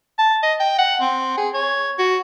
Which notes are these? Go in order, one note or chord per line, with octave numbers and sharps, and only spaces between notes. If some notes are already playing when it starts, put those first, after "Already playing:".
A5
D#5
G5
F#5
C4
G#4
C#5
F#4